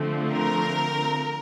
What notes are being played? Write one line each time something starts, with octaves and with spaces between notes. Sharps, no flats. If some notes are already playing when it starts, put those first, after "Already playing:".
Already playing: D3 F3 A3 C4
A#4